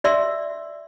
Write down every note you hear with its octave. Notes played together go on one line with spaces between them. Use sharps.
F#4 D5 E5 C6 E6